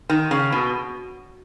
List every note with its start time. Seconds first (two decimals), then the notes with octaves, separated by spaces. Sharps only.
0.09 D#3
0.31 C#3
0.52 B2